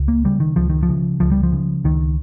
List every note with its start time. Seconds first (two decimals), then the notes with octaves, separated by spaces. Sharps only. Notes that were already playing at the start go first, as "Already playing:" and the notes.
Already playing: C#2
0.08 A#3
0.25 C#3 G3
0.40 D#3
0.56 C#2 F3
0.70 D#3
0.83 F3
0.89 C#3
1.20 C#2 F3
1.32 G3
1.43 F3
1.52 C#3
1.84 C#2 D#3